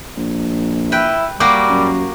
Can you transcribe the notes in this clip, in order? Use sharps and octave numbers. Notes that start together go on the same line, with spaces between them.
A#1
E4 B4 G5
G3 A#3 F#4 G4 D6
F#2